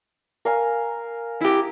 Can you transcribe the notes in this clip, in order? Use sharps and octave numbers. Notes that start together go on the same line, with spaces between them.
A#4 F5 G#5
E4 G4